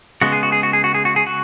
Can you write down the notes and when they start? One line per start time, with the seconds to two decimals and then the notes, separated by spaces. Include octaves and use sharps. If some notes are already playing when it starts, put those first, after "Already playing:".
0.21 C#3 G#3 B3 F#4
0.32 G#4
0.43 F#4
0.52 G#4
0.63 F#4
0.73 G#4
0.84 F#4
0.94 G#4
1.05 F#4
1.16 G#4
1.27 F#4